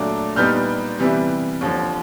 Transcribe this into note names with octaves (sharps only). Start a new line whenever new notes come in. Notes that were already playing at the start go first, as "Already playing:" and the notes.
Already playing: A#2 F#3 A3 D4
A#2 G3 B3 D#4 F6 G6
C3 E3 G3 B3 E4
D#2 D3 F3